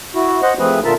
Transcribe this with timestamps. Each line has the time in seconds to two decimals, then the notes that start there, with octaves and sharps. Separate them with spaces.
0.15 E4 F#4
0.43 C5 D#5 F#5
0.59 C3 F3 A3 C4 G#4 B4
0.84 A#2 D3 F4 A#4 E5 A5